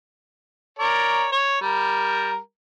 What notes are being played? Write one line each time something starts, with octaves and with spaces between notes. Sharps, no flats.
A#4 C#5 D5
C#5
G3 A#4